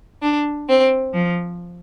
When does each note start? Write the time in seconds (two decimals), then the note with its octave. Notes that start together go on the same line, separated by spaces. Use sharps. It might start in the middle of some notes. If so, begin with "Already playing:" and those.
0.22 D4
0.68 C4
1.14 F3